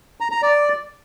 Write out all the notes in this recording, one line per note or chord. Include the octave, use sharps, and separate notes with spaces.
A#5
A#5
D5